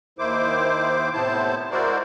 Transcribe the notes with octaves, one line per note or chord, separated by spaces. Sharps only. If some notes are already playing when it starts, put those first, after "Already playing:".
D#2 D#3 E4 C5 D6
A2 C3 B3 E4 C5 A5
G#3 E4 F#4 A#4 C5 D5